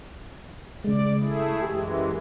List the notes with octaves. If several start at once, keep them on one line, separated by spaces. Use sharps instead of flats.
C#3 G#3 D5
A3 E4 G#4
F#2 E3 G#3 G4